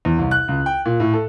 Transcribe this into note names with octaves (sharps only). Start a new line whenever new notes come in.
E2
C2
F#6
C#2
G5
A#2
A2
A4